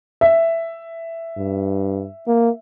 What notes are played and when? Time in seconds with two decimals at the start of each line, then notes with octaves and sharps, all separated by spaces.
0.21 E5
1.37 G2
2.27 A#3